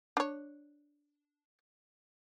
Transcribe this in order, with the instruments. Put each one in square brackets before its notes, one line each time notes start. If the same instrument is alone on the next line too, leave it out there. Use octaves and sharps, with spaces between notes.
[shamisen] D4 C#5